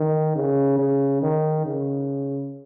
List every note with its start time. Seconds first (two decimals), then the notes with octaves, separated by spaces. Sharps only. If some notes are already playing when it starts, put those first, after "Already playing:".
Already playing: D#3
0.35 C#3
0.78 C#3
1.22 D#3
1.65 C#3